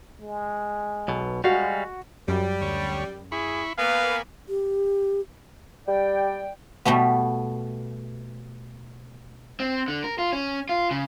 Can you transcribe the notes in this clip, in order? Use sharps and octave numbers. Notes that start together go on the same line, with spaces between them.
G#3
B1 B2
G3 G#3 F#4 F5
F#2 G3
D2 C#5
E4 G#4 B5 C#6
A#3 B3 B4 F5 G#5
G4
G3 D5 G5
B2 G3 A3 B3
C4
D3
A#4
F4
C#4
F4
C#3